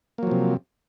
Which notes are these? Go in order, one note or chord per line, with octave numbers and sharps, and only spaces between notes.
C3 F3 F#3 A#3